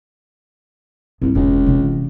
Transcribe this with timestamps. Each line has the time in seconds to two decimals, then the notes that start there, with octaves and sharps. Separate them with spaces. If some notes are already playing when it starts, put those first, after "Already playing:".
1.22 C2 G#2 E3
1.35 E1 C#2
1.66 C3 E3